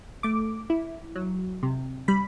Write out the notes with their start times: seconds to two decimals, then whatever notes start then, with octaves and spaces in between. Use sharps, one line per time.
0.23 A3 D6
0.70 E4
1.16 F#3
1.63 C3
2.08 G3 B5